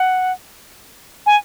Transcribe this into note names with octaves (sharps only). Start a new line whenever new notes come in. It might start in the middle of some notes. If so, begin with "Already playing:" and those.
Already playing: F#5
G#5